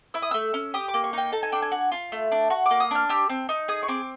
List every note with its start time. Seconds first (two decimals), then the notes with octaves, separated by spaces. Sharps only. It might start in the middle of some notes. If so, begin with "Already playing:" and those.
0.14 E4 E6
0.22 D#6
0.31 A3 E6
0.54 C#4
0.74 G4 D#6
0.88 D6
0.94 A#3
1.04 C#6
1.13 D#4 G5
1.32 A4 A5
1.43 G#5
1.52 D4 G5
1.62 G#5
1.72 F#4
1.92 F4
2.12 A3
2.32 D4
2.50 F#4 C#6
2.66 A#3 D6
2.80 D#6
2.91 D4 F6
3.09 G4 E6
3.29 C4
3.49 D#4
3.68 G#4 D#6
3.83 C#6
3.88 C4 D6